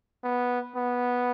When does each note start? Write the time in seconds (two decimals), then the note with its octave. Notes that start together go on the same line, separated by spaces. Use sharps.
0.23 B3
0.75 B3